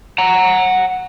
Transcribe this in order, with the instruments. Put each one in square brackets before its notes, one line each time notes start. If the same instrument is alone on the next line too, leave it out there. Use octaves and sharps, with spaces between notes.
[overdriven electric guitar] F#5 A#5